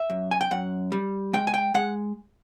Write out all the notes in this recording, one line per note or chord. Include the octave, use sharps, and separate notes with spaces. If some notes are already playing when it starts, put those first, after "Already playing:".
Already playing: E5
F#2
G#5
G5
F#2 F#5
G3
G#3 G5
G#5
G5
G#3 F#5